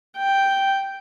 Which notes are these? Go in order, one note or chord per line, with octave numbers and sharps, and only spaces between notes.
G5